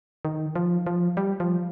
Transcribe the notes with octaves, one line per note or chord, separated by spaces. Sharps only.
D#3
F3
F3
G3
F3